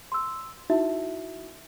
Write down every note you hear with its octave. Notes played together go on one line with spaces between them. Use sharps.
C6 E6
D#4 E4 F#4 E5